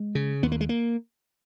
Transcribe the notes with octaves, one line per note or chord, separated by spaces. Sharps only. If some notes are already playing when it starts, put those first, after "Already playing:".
Already playing: G#3
C#3
D#2 B3
A#3
G#3
A#3